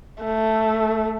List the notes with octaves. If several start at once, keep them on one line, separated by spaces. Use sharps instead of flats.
A3